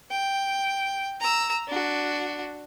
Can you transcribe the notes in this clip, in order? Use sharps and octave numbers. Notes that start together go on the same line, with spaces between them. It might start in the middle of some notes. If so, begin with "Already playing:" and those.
G5
A#5 E6
D4 F#4